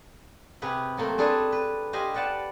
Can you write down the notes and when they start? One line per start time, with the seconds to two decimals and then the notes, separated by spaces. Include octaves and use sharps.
0.62 C3 G4 G#4 B4 B5
0.97 F#3 A3 A#3 C4
1.18 C4 D4 G#4 A4 B4
1.52 B4
1.93 G4 C5 D#5 F5 G#5 B5
2.14 B4 D5 F#5 G5 A5